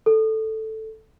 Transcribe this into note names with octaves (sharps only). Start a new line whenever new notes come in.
A4